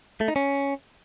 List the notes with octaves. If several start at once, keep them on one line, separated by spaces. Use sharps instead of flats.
A3
D#4
C#4